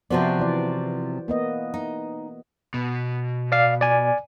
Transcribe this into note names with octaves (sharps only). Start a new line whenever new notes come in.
C3 F3 B3 F#4 C5 D5
E3 D5
A#3 B3 D#5
D#4
B2
D5 F5
D5 G#5